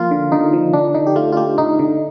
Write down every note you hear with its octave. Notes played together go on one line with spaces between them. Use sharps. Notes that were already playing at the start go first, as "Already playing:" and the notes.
Already playing: F3 A#3 F4
D3
D3 D#4
F3
D3 D4
D3 D#4
G4
A3 F4
F4
A3 G4
D3 D#4
D3